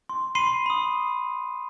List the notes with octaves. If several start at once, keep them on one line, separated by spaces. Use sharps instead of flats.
C6
B5 C6 C7 D#7
B5 D#6